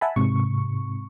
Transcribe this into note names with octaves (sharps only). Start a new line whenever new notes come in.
E5 F#5 G#5 A5 B5
G#2 C3 C#6